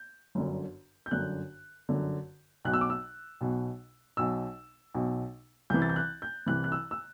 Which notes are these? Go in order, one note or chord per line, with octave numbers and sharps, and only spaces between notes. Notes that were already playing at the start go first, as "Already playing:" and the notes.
Already playing: G6
G1 F#2 D3
G6
G1 F#2 D3 F#6
G1 F#2 D3
B1 B2 F#6
E6
D6
E6
B1 B2
B1 B2 E6
B1 B2
C2 C3 E3 G6
A6
G6
F#6
G6
C2 C3 E3 F#6
F#6
E6
E6